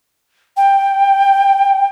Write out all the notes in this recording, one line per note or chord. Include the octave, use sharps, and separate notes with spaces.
G5